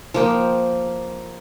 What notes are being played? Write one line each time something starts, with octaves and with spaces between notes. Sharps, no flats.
F3 A#3 G5